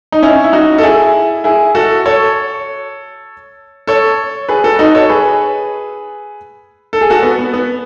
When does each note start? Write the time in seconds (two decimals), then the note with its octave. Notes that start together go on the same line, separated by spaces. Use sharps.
0.12 D#4
0.23 C#4 E4
0.44 E4
0.53 D#4 F#4
0.78 A4
0.83 E4 G#4
1.44 E4 G#4
1.75 F#4 A4
2.06 A4 C#5
3.87 A4 C#5
4.49 G#4 B4
4.64 F#4 A4
4.79 D#4 F#4
4.95 A4 C#5
5.09 G#4 B4
6.93 A4
7.01 G#4
7.10 F#4 A4
7.23 B3
7.38 B3
7.54 B3